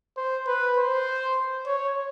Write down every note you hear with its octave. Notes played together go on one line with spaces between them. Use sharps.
C5
B4
C5
C#5